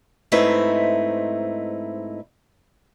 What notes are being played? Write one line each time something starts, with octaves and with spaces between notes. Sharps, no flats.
G#2 A3 C4 D#4 E4 B4